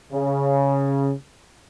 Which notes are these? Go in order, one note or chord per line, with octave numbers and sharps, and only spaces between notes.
C#3